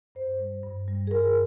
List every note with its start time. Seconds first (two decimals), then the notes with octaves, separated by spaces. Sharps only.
0.15 G2 C5
0.40 G3
0.63 G2
0.88 G3
1.07 G#4
1.11 G2 A#4